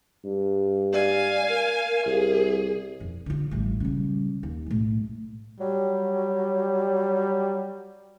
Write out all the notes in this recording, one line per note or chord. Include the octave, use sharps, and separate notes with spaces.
G2
D5 F5 G#5
A#4
C2 G#4
F2
D3 F4
A1 G3
C#3 G3
D#2
B1 A2
F#3 G3